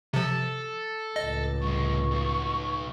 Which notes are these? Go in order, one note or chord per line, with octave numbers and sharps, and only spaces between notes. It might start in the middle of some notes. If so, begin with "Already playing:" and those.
C3 F3 A4
C#2 A2 D#5
C2 G#3 C#6
B1 B2